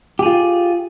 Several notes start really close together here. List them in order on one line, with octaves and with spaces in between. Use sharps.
G4 G#4 F4